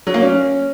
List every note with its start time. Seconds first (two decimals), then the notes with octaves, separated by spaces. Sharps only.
0.07 F#3
0.14 A#3
0.22 C#4